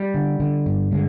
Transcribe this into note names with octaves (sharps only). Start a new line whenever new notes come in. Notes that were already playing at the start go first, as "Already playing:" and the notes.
Already playing: G3
D3
D3
G2
D3 G#3